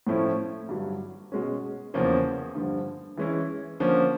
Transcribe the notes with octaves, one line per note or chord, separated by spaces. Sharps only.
A2 F3 A3 C#4 E4
G2 D3 F#3
B2 G#3 C#4
E2 C#3 F3 A#3 C#4
G2 D3 F3
E3 G#3 C#4 E4
D3 F3 A#3 C#4